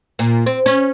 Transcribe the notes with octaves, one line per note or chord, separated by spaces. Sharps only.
A#2
C4
C#4